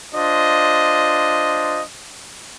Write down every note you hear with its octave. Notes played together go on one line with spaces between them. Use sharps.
D4 F4 C5 D#5